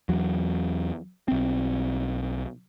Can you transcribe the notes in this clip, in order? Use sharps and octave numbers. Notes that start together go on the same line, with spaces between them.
E2 F#3
B1 C4